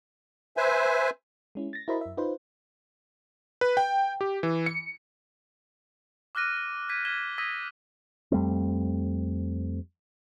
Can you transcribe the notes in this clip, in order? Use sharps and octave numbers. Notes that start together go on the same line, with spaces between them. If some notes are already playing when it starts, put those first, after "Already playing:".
B4 C5 E5 G#5
G#3 C#4 E4
A6 A#6
E4 F#4 A#4 C5 D#5 B5
F#2 E5
D#4 F4 B4 C5
B4
G5
G4
E3
C#7
D6 F6 F#6 A#6 D#7
A#6
G6 G#6 B6 D#7
F6 G#6 B6 E7 G7
D#6 E6 G#6 A#6 B6 D#7
F2 G3 A3 C4